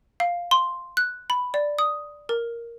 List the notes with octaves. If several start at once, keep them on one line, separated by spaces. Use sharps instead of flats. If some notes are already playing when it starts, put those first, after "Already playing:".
F5
C6
F#6
B5
D5
D#6
A#4